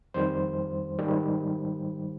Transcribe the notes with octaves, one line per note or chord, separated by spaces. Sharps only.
F2 D#3 G3 C5
G#2 D#3 G3